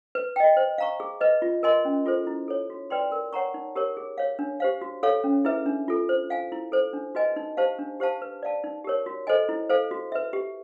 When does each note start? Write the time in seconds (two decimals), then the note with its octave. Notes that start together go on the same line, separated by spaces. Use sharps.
0.15 B4
0.36 D#5 G5
0.57 C5
0.78 F5 A#5 C#6
1.00 G#4
1.21 B4 D#5
1.42 F4
1.63 A#4 D#5 G#5 C6
1.85 C#4
2.05 F4 A4 C5
2.27 E4
2.48 A4 C#5
2.70 F#4
2.90 B4 D5 G5 C6
3.12 A#4
3.33 C#5 F#5 A#5 C#6
3.54 D#4
3.75 G4 A#4 C#5
3.97 G#4
4.18 C#5 F5
4.39 D4
4.60 G4 C5 F5
4.81 F#4
5.03 A4 C#5 F5
5.24 C#4
5.45 E4 G#4 B4 E5
5.66 D4
5.88 F4 A4
6.09 C5
6.30 F5 G#5
6.52 E4
6.72 A4 C5
6.93 D4
7.15 F#4 B4 D#5 G#5
7.36 D#4
7.57 G4 C5 F5 A5
7.79 D4
8.00 G4 C5 F5 A5
8.22 B4
8.43 D5 F5 A5
8.64 D#4
8.84 G4 A#4 C#5
9.06 F#4
9.27 A4 C5 D#5 G#5
9.49 E4
9.70 A4 C5 F5
9.91 F#4
10.12 B4 E5
10.33 G4